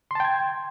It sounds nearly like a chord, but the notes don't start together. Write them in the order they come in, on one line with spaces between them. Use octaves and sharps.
C6 A5 G5 G#6